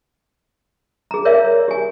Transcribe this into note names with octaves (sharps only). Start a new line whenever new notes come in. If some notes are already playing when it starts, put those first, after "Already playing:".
G#4 A#5
A#4 C#5 D5 E5 F5
G4 G#5